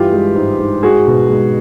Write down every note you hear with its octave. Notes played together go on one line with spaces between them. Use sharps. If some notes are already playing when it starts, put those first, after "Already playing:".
Already playing: G2 E3 F4 G4
G#3
G#2
G#2
G#3 F#4 G#4
B2
G#3